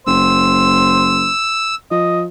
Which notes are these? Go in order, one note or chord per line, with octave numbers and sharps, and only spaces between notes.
F#1 C5 E6
F3 D#5